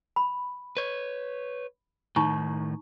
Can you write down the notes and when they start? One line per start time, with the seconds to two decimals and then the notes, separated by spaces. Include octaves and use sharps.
0.16 B5
0.77 B4 C#5
2.16 A2 D#3 D#4 A#5 C#6